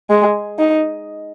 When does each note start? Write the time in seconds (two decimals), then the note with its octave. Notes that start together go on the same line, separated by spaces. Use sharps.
0.10 G#3
0.59 D#4